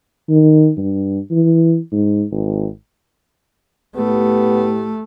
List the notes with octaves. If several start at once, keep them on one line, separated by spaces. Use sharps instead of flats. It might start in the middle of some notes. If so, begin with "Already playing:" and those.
D#3
G2
E3
G#2
G#1
A2 A3 B3 G4